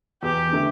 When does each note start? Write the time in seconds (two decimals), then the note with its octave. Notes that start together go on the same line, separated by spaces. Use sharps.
0.23 E2 G4
0.52 D3 A3